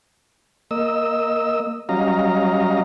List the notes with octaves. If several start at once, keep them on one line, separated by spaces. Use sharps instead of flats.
A#3 D#5 E6
F#3 G3 C#4 D#5 F5 A#5